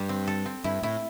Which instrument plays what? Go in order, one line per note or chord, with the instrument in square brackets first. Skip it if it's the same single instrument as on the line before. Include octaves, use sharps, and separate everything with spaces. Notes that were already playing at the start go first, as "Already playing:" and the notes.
Already playing: [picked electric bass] G2 [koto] G3 G4
[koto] C4
A4
C4
[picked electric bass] G2 [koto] E4
[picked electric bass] A2 [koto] E4